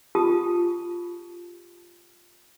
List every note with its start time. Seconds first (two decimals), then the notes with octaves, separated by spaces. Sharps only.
0.15 F4 G4 A5 D#6